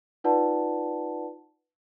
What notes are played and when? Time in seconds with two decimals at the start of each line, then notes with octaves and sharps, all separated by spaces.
0.24 D#4 F4 B4 D5 F#5 A5